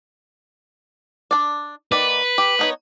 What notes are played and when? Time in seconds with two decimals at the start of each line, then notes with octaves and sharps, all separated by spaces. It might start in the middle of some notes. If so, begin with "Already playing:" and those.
1.31 D4 D5
1.92 D#3 A#3 B4 D5
2.38 G4
2.59 B3 D#4 C#5